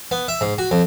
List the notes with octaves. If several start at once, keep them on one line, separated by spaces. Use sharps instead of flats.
B3
E5
G#2
F#4
F2